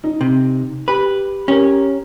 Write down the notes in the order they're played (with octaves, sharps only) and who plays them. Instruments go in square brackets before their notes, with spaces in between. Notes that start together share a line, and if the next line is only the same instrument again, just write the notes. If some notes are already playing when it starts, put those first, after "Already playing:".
[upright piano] D#4
[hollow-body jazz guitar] C3
[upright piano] G4 [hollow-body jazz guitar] B4
[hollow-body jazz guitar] C#4 [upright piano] G4 A#4